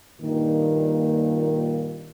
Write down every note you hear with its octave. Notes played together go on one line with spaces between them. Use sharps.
G2 A#2 D#3